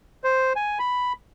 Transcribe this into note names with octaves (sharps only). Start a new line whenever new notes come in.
C5
G#5
B5